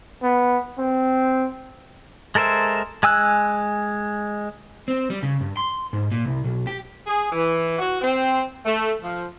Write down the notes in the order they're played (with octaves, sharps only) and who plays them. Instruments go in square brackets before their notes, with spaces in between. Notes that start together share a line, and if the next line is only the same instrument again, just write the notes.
[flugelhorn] B3
C4
[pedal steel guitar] G#3 A4 A#4 C5 E5
G#3 G#5 E6 F#6
[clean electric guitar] C4
G3
C#3
G2
C6
G#2
A#2
C2
B1
G4
[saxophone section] G#4
E3
F#4
C4
A3
F3